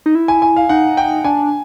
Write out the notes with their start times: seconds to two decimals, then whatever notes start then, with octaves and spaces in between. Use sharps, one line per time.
0.06 D#4
0.15 E4
0.28 G#5
0.42 G#5
0.57 F5
0.69 D#4 F#5
0.97 G5
1.24 D4 G#5